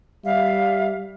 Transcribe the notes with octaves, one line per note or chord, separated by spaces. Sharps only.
G3 E5 F5